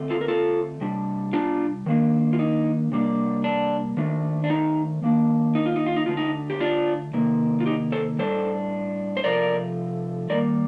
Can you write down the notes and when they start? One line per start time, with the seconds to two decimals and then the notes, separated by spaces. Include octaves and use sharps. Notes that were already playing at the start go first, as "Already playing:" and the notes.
Already playing: D3 A3 C4
0.10 F4 A4
0.21 A#4
0.28 F4 A4
0.81 C3 G3 D4
1.33 D4 F4
1.86 D#3 A#3 D4
2.33 F4
2.39 D#4
2.92 C3 G3 A#3 D4
3.44 D4
3.97 D#3 A3 D4
4.44 D4
4.50 D#4
5.03 D#3 A#3 D4
5.55 D#4
5.66 F4
5.76 D#4
5.86 F4
5.96 D#4
6.06 D3 A3 D4 F4
6.17 D#4
6.50 G4
6.60 D4 F4
7.13 C3 D#3 A#3
7.60 F4
7.66 D#4 G4
7.92 A4 C5
8.19 A2 G3 D4 A4 C5
9.17 C5
9.24 C3 F3 A3 A#4 D5
10.30 D#3 G3 A#3 A#4 D5